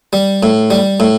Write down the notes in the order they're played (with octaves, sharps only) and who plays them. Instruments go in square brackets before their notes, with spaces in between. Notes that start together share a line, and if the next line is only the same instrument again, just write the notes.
[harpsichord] G3
A2
G3
A2